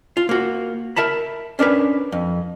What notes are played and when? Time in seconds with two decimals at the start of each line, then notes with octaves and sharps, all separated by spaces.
0.17 F4
0.29 A#3 F#4
0.96 A#4 E5 A5 B5
1.59 C#4 D4 A#4 B4
2.12 F2